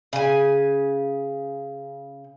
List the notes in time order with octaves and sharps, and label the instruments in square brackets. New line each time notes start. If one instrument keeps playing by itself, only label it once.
[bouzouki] C#3 G#5